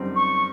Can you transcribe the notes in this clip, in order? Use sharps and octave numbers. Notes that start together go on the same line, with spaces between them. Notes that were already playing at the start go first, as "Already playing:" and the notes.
Already playing: F#2 D3 G3 C4 D#4
C#6